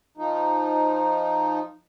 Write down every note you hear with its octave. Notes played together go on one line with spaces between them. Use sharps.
F3 D#4